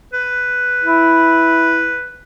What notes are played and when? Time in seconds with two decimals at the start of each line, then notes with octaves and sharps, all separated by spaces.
0.13 B4
0.84 E4